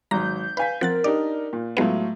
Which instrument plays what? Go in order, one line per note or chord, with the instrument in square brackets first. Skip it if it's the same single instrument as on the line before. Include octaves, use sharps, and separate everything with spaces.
[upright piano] G#1 F#3 [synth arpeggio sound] A#5 [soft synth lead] G6
[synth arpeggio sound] B4 [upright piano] F5 G#5 B6
[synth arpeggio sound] F3 F#5 A6 [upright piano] C4 [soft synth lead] A#4
[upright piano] D4 D#4 G4 [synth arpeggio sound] D5
[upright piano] A#2
[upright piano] A2 F#3 F4 [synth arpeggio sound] G#3 B3 [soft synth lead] A3